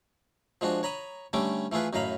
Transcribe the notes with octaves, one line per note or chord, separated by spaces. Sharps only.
F3 G#3 D4 F#4
C#5 A#5 B5 D#6
D3 G3 A3 C#4 D6
E3 A3 F4 G#4 B4
F#2 A2 D#5 F5 A#5 B5